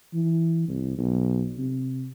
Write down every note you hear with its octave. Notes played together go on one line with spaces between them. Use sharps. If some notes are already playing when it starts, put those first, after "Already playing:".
E3
C2
B1
C3